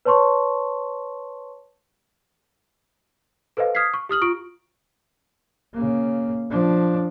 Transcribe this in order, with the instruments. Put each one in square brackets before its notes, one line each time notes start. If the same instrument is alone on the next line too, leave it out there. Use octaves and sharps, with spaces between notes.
[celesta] B4 C#5 A5 C6 C#6
A4 B4 C5 D#5 F5
D#6 F6 G#6 B6 C7
C#6
G4 D#6 F6 F#7
F4 C#6 D7
[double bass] C#3 A#3
F3 D4